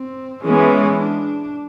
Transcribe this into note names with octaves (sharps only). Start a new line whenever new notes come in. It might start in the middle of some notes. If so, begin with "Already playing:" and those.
Already playing: C4
E3 G#3 B3 C#4
D4